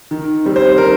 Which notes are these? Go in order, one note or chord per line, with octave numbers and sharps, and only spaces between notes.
D#3
G3 C4
C5
D#3 A#4